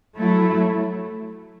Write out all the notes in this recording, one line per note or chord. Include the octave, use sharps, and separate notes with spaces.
F#3 A3 E4